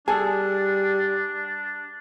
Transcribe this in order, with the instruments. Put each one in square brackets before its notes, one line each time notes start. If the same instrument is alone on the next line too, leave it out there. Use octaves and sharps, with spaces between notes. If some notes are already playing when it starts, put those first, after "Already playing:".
[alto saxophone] G3 [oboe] D4 [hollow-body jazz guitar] G#4 [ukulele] A4 G#5 A5